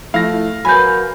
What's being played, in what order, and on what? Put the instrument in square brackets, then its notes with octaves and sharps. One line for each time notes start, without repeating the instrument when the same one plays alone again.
[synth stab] F3 E4 [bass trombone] A3 [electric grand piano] F5 A#6
[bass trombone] F#3 [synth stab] A#4 B4 G#5 [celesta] B5 G6